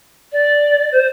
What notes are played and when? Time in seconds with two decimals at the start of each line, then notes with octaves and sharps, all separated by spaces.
0.32 D5
0.92 C5